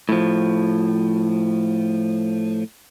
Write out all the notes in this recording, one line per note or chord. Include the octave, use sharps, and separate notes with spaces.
A2 F3